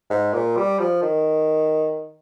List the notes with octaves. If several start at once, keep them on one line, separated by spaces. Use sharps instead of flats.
G#2
A#2
G3
F3
D#3